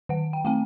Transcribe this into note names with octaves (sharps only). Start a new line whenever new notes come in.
D#3 F#5
G5
A3 C4 G5